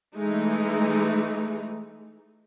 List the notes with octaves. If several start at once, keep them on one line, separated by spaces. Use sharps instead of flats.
E3 G#3 A3 D#4